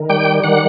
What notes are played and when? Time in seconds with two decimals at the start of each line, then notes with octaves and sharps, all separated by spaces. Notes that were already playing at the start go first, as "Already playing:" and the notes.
Already playing: D#3
0.09 G3 G5
0.43 D#3 F#5